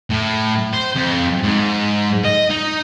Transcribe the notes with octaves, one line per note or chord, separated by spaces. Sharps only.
A2
C5
F2
G#2
D#5
D#4